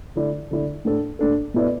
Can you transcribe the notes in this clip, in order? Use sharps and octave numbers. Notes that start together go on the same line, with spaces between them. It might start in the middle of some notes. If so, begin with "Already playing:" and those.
D3 A3 E4 D5
D3 A3 E4 D5
A2 A3 D4 A4
A2 A3 D4 A4
B2 A3 E4 B4 D5